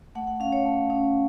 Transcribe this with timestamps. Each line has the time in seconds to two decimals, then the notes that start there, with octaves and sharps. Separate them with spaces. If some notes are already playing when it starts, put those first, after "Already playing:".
0.15 A3 F#5
0.27 F#5
0.40 C#4 F5
0.52 C#5
0.65 A3
0.90 C#4